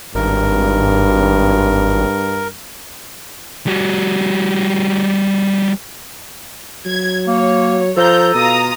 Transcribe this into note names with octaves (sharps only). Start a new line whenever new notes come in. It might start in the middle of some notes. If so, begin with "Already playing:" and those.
G#1 G2 A#4
G3 F#4
F#3 G#6
A#3 C#5
F3 A4 A#5 G6
B2 F4 A#5 D#6